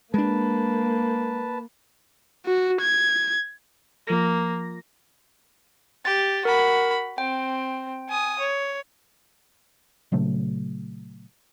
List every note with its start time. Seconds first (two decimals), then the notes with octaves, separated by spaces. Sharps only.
0.14 G#3 A#3 D4 B4 A5
2.46 F#4
2.81 G#6
4.07 F3 A#3 A#6
6.05 G4 A6
6.45 F#4 A#4 B5
7.18 C4 G5
8.09 G#5 D#6
8.40 C#5
10.12 A#2 C#3 F#3 A3